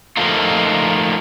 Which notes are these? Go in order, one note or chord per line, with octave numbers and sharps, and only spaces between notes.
F3 A3 A#3 D#4 F4